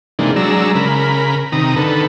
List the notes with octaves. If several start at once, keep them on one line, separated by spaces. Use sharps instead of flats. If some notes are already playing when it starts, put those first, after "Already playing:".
C3 E3 G#3 A#3 D4 D#4
F#3 G#3 D4 A#5 E6
C#3 A#4 B5
C3 D#3 A#5 D#6
D3 D#3 A4 B4